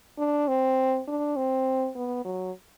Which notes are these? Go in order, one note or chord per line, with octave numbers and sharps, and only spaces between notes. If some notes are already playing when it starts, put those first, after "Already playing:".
D4
C4
D4
C4
B3
F#3